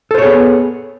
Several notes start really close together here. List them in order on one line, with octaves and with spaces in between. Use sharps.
A4 C5 C#5 G#4 B3